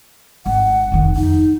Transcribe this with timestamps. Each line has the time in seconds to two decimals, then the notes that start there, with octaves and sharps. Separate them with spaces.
0.46 G#1 F#5
0.92 F1 D#3
1.16 F2 D#4